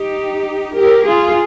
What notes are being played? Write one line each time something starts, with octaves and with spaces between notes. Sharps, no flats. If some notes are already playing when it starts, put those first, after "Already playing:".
Already playing: D#4 G4
G4 A#4
F4 G#4